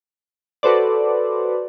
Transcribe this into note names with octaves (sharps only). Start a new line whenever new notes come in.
F#4 A4 B4 C5 D5